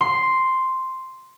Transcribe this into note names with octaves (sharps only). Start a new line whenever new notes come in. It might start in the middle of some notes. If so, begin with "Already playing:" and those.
C6